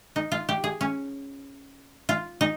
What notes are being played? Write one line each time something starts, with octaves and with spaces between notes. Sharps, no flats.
D#4
F4
G4
G#4
C#4
F4
D#4